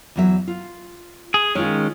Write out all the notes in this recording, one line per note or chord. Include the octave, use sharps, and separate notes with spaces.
E2 F#3 E5
F4
G#4
D#3 G#3 C#4 F4 C#5